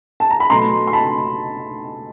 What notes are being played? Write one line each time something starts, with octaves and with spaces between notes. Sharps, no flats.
A5
A#5
B5
B2 F#3 A3 A#5 C6
C6
A5 B5